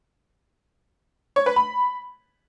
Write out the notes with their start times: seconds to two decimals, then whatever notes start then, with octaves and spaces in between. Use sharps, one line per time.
1.36 C#5
1.46 B4
1.56 B5